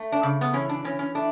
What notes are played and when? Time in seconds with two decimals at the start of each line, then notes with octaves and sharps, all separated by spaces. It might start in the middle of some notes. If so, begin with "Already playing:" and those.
Already playing: A3
0.12 D4
0.23 C#3
0.41 B3
0.53 E3 C#4
0.69 D4
0.84 E3 C#4
0.99 C#4
1.15 A3 D4